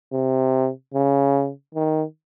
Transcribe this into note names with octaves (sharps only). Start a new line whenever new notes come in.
C3
C#3
D#3